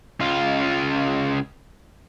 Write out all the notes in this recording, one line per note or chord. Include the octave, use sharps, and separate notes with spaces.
C#2 F4